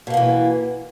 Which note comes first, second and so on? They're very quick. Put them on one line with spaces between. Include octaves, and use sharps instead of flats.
B2 A#3 B3 E3